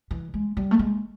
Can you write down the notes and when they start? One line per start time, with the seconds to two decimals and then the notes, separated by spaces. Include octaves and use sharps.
0.11 E3
0.34 G#3
0.57 G3
0.71 A3
0.79 G#3